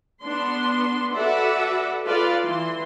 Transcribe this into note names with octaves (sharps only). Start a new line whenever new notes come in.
B3 D4 C6
F#4 A4 B4 D5 E5 F#5
F4 A4 B4 D5 F5
E3 C6